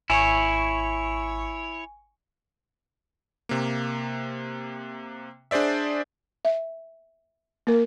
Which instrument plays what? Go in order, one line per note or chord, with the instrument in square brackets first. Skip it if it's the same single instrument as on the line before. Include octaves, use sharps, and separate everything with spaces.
[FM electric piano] G#1 C#6 C#7 [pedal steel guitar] E4 C#5 [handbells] G#5
[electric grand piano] C3 A#3
D4 G#4 C5 D5 E5
[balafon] E5
A#3 A#4